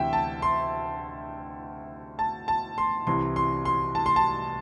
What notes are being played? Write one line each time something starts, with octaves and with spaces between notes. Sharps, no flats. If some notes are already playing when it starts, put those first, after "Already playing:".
Already playing: D2 C3 E3 E5 G5
A5
C6
A5
A5
C6
C2 C3 E3 C6
C6
C6
A5
C6
A5